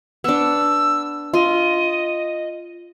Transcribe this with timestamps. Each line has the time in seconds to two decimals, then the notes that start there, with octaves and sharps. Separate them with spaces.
0.24 B3 D4 E6
1.33 F4 D#5